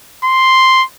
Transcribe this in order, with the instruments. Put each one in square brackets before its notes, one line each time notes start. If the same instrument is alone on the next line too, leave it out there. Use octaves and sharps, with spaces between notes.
[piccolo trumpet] C6